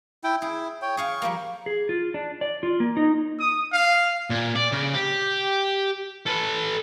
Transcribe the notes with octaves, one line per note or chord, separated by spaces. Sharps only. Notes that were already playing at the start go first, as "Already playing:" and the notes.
E4 G5
E4 G#4
C#5 G5
G#4 F5 G#5 C#6
F3 G3 A#3
G#4
F4
D4
D5
F4
A#3
D#4
D#6
F5
A#2
D5
C#3
G4
A4 B4